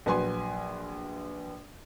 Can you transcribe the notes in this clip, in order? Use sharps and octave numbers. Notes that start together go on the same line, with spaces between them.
A#1 F#3 B4 G#5 C6